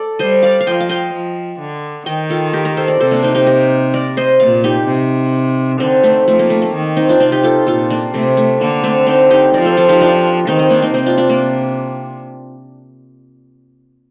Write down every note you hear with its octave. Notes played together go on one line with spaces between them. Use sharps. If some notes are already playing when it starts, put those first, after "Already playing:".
Already playing: A4 D5
G3 C5 D#5
D5 F5
F5
F3 D#5 G5
F5
D#5 G5
F3
D3
D#3 D#5 G5
F4 A4
G4 A#4
G4 A#4
A4 C5
A#4 D5
C3 A4 C5
A#3 D4
C4 D#4
D#4 G4
G4 A#4
A#4 D5
C5 D#5
A#2 D5 F5
D#4 G4
C3
D3 C4 D#4
A3 C4
F3 A3
A#3
A3
A#3
D#3
C4 D#4
D4 F4
C3 C4 D#4
D#4 G4
F4 A4
A#2 F4 A4
A#3 D4
C3 A3 C4
A3
D3 A#3
A3 C4
C4 D#4
D#4 G4
F3 A#4 D5
A4 C5
F4 A4
D#4 G4
D4 F4
D#3 C4 D#4
C4 D#4
A#3 D4
C4 D#4
C3 C4 D#4
D4 F4
D4 F4
A#3 D4